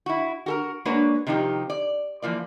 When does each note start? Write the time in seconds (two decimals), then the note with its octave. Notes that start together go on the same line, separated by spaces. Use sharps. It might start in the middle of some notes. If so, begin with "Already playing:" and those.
0.06 E4 F#4
0.46 F#4 A4 A#4
0.85 G#3 A#3 D4 F#4 B4 C#5
1.27 C3 D#3 F3 D#4 G4
1.70 D5
2.22 E3 F3 A#3 D5